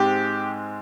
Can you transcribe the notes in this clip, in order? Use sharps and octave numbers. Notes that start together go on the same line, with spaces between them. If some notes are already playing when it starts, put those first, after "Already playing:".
Already playing: G#2 G#3 C4 G4